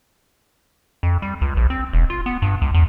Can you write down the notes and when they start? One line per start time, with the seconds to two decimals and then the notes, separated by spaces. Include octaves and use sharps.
1.03 F2
1.22 G3
1.41 C#2
1.57 A#1
1.70 C4
1.93 E1
2.10 F4
2.26 B3
2.42 G2
2.62 C#2
2.74 E2